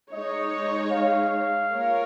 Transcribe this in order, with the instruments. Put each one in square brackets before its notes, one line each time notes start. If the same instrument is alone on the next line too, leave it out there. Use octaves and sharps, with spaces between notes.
[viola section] G#3 D#4 C#5 [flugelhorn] D#5
[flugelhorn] F5
[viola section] A#3 F4 A#4 C#5